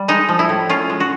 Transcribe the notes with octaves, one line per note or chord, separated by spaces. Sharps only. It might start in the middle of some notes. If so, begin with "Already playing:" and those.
Already playing: G3
G#3 D#4
F3
E4
A2
C#4 F4
G#3
F#4